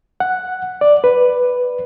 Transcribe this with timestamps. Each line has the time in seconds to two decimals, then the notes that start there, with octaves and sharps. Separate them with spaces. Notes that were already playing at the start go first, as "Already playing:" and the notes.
0.20 F#5
0.81 D5
1.04 B4